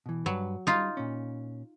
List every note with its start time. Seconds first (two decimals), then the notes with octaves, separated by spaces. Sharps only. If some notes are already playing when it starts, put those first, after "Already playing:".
0.06 B2 E3
0.26 G2 F#3 B4
0.67 G3 D#4 F4
0.97 A#2 C#4